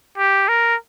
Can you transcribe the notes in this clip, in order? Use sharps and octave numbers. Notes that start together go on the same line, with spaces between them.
G4
A#4